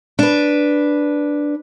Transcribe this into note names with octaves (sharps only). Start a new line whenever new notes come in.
D4 B4